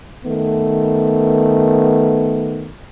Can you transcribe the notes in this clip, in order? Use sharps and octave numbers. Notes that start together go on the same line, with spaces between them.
D#3 A3 B3